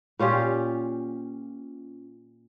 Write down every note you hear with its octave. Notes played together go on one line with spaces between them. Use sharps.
A#2 C#4 F4 G4